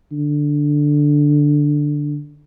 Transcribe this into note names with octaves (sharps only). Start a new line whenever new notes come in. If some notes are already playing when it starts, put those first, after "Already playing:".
D3